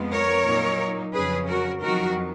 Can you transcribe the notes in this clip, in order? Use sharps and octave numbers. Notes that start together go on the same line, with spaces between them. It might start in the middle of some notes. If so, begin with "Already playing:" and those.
Already playing: F2 F3 G#3 B3
A#4 C#5
A#2 F#3 A#3 D#4
F2 C#3 F#3 C#4 G#4 B4
F#4 A#4
F2 D#3 F#3 F#4 A#4